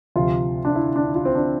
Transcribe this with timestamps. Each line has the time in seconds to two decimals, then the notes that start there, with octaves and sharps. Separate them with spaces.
0.16 D2 C3 F3 F4
0.65 D4
0.75 E4
0.96 D4
1.14 F4
1.25 C4
1.35 D4